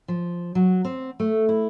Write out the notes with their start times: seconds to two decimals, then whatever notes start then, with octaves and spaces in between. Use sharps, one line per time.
0.08 F3
0.55 F#3
0.85 C4
1.20 A3
1.49 E4